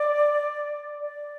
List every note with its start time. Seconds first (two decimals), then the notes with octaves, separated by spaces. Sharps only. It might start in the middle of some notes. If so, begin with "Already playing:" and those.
Already playing: D5
1.00 D5